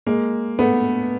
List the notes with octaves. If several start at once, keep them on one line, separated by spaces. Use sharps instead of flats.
G#3 A#3
A3 B3